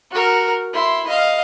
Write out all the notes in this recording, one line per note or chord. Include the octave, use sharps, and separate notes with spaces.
F#4 A#4
E4 C6
D#5 F5